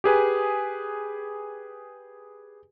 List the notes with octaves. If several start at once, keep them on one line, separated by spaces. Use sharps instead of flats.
G4 G#4 B4 G#5